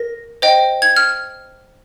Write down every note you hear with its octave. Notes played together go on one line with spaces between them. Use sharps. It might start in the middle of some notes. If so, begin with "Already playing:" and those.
Already playing: A#4 A#6
C5 D#5 G5
G#6
F6